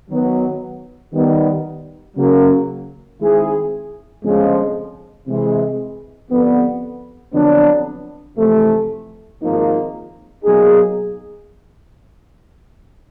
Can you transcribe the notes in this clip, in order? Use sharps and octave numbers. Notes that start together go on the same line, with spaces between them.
D#3 F#3 B3
D#3 G3 B3
C#3 F#3 A#3
D#3 G#3 C4 E4 G#4
G1 F2 C#3 F3 G#3
C3 E3 G#3
G1 F2 D3 G3 B3
F2 D3 F#3 B3 D4
F2 C3 E3 A3
G#1 G#2 F3 A#3 D#4
B2 F#3 A#3 D#4 G#4